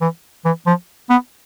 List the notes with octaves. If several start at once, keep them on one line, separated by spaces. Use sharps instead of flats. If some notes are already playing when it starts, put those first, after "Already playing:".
E3
E3
F3
B3